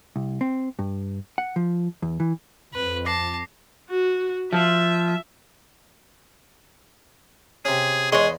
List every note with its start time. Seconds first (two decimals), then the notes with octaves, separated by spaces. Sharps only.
0.16 C2
0.41 C4
0.79 G2
1.38 F#5
1.56 F3
2.02 E2
2.20 E3
2.74 F2 B4
3.06 A5 D6 A#6 C7
3.89 F#4
4.53 F3 E5
7.65 C3 C#4 G#4
8.12 E2 G#3 G#4 C#5 C6